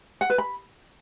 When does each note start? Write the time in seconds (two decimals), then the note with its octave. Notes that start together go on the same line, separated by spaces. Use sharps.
0.21 F#5
0.30 B4
0.38 B5